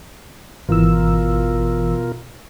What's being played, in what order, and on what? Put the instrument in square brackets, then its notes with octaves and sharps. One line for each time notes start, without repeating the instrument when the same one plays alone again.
[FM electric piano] G#1 E3 E6 [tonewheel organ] B2 F4 A#4